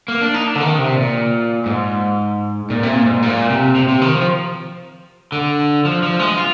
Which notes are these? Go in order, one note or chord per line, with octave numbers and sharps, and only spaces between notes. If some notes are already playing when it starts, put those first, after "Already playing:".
A#3
D4
D#4
D4
D3
D#3
C3
A#2
G#2
A#2
C3
A#2
G#2
A#2
C3
C3
C3
D#3
F3
D3
F3
F3
G#3
F4